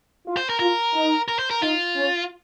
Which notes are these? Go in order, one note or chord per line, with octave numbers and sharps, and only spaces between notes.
F4
C5
A#4
F4 A#4
D#4
A#4
C5
A#4
D#4 F4
C#4